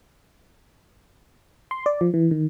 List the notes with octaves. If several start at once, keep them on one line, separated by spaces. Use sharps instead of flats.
C6
D5
F3
E3
D#3